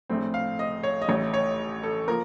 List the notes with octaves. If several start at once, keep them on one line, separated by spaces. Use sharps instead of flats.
A#1 A2 A3 C4
F5
D#5
C#5
D#5
A1 A2 A3 D#4 C#5
C#5
A4
F3 A#3 A#4